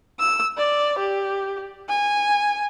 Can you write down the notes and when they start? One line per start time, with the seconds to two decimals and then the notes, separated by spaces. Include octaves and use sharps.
0.19 E6
0.57 D5
0.98 G4
1.89 G#5